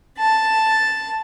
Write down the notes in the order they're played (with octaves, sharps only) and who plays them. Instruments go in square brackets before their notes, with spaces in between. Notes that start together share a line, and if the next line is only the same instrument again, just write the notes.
[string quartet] A5